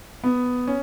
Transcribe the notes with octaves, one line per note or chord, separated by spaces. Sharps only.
B3
C#4